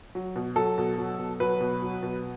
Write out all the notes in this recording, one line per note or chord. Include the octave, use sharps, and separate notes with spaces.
F#3
B2
F#3 A4
B2
F#3
B2
F#3 B4
B2
F#3
B2